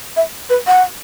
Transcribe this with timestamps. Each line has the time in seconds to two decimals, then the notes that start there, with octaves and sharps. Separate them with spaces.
0.16 E5
0.49 B4
0.67 F#5